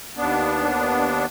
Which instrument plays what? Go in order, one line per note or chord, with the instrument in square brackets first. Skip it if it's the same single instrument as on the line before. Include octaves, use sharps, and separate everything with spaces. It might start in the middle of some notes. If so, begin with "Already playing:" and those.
[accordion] D#2 B3 D4